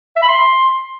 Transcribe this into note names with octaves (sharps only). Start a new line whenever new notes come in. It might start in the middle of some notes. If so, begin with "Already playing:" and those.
E5
B5
C6